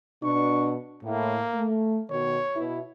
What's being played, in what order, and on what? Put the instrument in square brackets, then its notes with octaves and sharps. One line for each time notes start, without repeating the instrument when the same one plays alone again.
[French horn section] B2 D4 [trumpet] C#6
[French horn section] A2 [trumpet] A#3
[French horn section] A3
[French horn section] B2 D#3 [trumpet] C#5
[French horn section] B2 E4